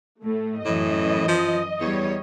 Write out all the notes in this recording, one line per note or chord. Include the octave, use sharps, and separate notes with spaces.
A2 A3
F#2 A2 E3 D#5
F3
E2 G3 C#5